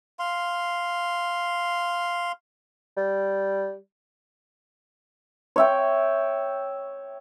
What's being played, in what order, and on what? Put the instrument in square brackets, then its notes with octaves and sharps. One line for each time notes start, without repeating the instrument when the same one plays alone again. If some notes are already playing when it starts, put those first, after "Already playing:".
[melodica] F5 C6
[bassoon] G3
[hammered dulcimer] C#5 E5 G5